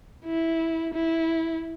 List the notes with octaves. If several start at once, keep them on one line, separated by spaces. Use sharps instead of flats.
E4
E4